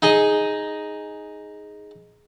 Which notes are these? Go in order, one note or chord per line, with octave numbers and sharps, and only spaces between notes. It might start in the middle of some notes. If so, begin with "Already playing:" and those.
D#4 G#4 D#5